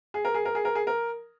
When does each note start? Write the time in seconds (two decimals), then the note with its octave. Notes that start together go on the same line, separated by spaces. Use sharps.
0.14 G#4
0.25 A#4
0.34 G#4
0.45 A#4
0.55 G#4
0.65 A#4
0.75 G#4
0.87 A#4